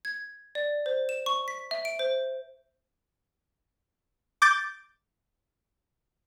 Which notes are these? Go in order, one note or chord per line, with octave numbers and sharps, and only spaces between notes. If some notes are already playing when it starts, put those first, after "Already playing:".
G#6
D5
C5
E7
C#6
B6
E5
D7
C5
D6 G6 A6 D7